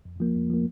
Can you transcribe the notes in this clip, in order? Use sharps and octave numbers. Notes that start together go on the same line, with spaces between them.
F2
F3 A#3
F2
F3 A#3